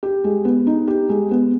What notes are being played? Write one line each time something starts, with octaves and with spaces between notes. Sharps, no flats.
G4
G#3
B3
D#4
G4
G#3
B3